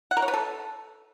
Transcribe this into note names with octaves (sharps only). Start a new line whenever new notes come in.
F#5
A#4
C#5
B4
A4